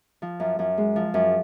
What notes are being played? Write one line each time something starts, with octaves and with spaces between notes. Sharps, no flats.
F3
F#2
F#2
G#3
F3
F#2